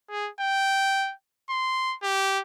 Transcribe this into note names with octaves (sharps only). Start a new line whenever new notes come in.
G#4
G5
C6
G4